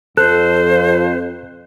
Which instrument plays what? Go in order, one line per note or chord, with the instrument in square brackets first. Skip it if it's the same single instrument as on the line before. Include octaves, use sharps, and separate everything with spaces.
[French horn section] F2 [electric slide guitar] A4 [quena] C5 [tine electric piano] F#6